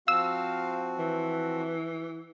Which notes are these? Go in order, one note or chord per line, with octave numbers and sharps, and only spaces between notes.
F3 C4 F#4 F5 E6
E3